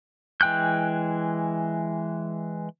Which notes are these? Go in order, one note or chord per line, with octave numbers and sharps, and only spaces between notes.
E3 G#3 G5 F#6 G6